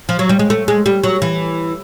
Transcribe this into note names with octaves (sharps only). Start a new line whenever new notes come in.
F3
F#3
G3
G#3
A3
G#3
G3
F#3
E3